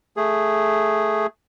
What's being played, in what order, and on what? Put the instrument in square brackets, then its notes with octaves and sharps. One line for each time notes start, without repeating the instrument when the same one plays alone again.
[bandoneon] A3 G#4